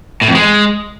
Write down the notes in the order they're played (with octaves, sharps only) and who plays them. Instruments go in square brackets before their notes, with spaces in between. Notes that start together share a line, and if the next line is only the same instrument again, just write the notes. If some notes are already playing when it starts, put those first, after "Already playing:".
[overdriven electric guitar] A2
F2
G#3